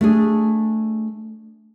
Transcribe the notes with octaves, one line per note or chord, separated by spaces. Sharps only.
A3 D4 G#4